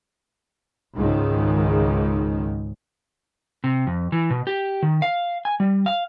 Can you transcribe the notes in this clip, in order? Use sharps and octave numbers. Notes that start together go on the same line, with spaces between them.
C#2 G#2 D#3
C3
F2
E3
B2
G4
D#3
F5
G#5
G3
F5